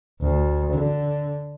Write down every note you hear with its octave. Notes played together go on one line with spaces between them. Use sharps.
D2
D3